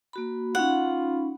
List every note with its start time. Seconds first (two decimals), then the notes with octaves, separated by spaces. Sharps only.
0.13 A#3 F#4 B5
0.55 C#4 D#4 F4 F#5 B5